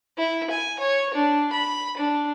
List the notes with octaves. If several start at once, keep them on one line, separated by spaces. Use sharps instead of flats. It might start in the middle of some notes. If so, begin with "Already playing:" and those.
E4
G#5
C#5
D4
B5
D4